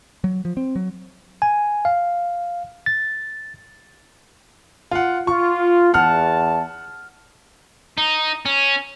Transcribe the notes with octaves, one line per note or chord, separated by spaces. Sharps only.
F#3
F3
C4
F#3
G#5
F5
A6
F4 F#5
F4 C#6
E2 F#5 A5 F6
D#4
C#4